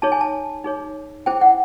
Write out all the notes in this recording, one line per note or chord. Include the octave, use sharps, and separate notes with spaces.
D#4 G#4 C#5 A5
G#5
A5
D#4 G#4 C#5
C#4 E4 G#4 C5 G5
F#5